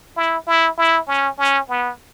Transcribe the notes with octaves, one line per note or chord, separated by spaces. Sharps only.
E4
E4
E4
C#4
C#4
B3